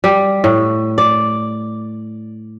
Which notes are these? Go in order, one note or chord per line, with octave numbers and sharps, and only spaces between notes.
G3
A2
D5